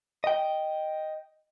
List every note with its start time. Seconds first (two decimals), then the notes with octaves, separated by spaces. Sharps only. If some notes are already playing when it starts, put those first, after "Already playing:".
0.24 D#5 G5